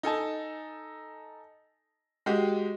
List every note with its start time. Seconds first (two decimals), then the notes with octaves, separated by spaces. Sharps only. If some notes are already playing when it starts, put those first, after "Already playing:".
0.03 D#4 A4 G#5 A5
2.26 G#3 F#4 G4